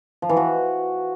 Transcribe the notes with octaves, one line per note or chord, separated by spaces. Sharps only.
F3
E3
F#4